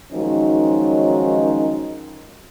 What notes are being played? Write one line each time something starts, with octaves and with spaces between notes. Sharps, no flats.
D#3 F3 F#3 G#3 C#4 D#4